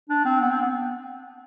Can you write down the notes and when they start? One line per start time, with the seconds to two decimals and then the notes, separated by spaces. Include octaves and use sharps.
0.09 D4
0.25 C4
0.40 B3
0.51 C4
0.61 B3